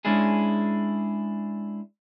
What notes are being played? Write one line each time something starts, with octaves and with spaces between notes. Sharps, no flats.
G#3 C#4 D4 E4 G#4